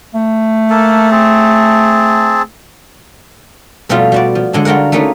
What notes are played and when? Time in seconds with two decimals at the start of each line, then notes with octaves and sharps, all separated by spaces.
0.14 A3
0.70 A#3 A4
1.11 C4 G#4 A5
3.89 F2 B2 G3 A3 F4
4.12 G3 F#4 D5
4.35 F3
4.53 D3 G#3 D4
4.65 G3 F4 F#4 A#4 F#5
4.92 A3 A#3 C#4 D#4 G#4 B4